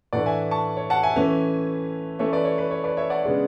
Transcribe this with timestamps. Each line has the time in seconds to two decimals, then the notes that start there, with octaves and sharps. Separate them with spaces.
0.13 A2 E3 A3 D4 D5 F#5
0.26 E5 G#5
0.51 A5 C#6
0.77 C#5
0.90 F#5 A5
1.03 E5 G#5
1.16 E3 A3 C#4
2.19 E3 A3 C#4 C#5 E5
2.33 B4 D5
2.45 C#5
2.58 B4
2.71 C#5
2.84 B4 D5
2.97 C#5 E5
3.10 D5 F#5
3.23 C#3 G#3 B3 D4